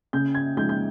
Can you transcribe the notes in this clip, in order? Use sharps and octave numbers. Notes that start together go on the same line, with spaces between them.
C#3 G6
G#6
F3 G#3 D#4 G6
G6